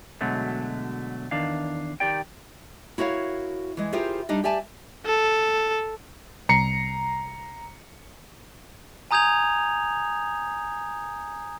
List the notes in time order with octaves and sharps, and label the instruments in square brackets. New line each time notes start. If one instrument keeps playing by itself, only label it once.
[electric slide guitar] B2 D3 F#3 G#3 A3
E2 D#3 D4 F5
D#3 G4 D5 G5
[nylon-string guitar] E4 F#4 A#4 C#5 F5
E3 G#3
E4 F4 G4 G#4 A#4 C5
G3 D4 D#4 D#5
G4 D5 E5 G#5 A5
[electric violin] A4
[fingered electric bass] C2 [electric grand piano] A#5 C7 C#7
[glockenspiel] G#5 A#5 D#6 G6 G#6 F7